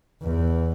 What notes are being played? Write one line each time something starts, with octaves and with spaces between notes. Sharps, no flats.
E2